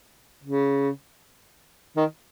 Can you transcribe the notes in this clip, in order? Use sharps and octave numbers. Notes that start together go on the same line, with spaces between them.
C#3
D#3